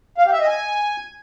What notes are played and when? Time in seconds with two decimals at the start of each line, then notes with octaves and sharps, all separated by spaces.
0.18 F5
0.25 G4
0.33 E5
0.40 D#5
0.47 G#5